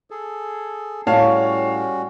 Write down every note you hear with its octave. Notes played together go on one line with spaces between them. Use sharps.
G#4 A4
A2 G3 C#4 F#4 C#5 F5 A5